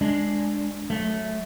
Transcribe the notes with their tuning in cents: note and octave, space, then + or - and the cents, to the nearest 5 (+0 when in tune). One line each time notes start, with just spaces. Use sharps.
G#3 +0 D4 +0
F#3 +0 A3 -10